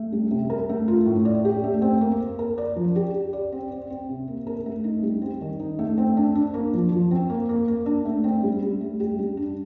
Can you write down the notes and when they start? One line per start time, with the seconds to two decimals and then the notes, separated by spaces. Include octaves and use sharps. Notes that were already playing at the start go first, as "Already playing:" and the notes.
Already playing: A3
0.12 G3
0.31 C3
0.50 A#4
0.69 A3
0.88 F4
1.06 A2
1.25 D5
1.45 G4
1.64 A3
1.82 C4
2.01 A#3
2.20 A#3
2.39 A#4
2.58 D5
2.76 F3
2.96 G4
3.14 G4
3.33 D5
3.52 C4
3.71 C4
3.90 C4
4.09 C3
4.28 A#3
4.47 A#4
4.66 A3
4.84 D#4
5.03 G3
5.22 C4
5.41 D#3
5.59 D#4
5.79 A3
5.98 C4
6.17 D4
6.35 D4
6.54 A#3
6.74 F3
6.92 F3
7.11 C4
7.30 A#3
7.49 A#3
7.68 A#3
7.86 D4
8.05 A3
8.24 C4
8.43 G3
8.62 G3
8.81 A3
9.00 G4
9.19 G3
9.37 D4